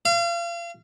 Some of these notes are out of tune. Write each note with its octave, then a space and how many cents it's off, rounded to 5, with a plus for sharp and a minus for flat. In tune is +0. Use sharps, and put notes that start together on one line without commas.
F5 -35